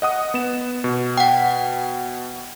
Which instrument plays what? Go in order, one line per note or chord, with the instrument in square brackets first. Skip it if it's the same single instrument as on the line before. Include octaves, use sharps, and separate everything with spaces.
[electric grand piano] D#5 F#5 D#6
B3 E7
B2
[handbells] F#5 G5